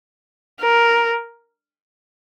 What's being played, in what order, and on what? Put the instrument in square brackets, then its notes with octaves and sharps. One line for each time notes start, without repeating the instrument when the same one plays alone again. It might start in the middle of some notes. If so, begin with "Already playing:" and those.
[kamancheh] A#4